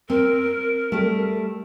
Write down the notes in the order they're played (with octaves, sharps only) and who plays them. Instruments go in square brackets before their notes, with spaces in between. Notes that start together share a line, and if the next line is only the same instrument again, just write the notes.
[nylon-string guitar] C4 [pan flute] A#4
[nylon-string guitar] G3 A3